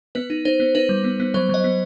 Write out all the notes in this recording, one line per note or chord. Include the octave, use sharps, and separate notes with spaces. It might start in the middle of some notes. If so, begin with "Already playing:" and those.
B3 B4
D#4
D#4 C5
B3
D#4 B4
G3
B3
B3
F#3 C5
F#3 D#5
B3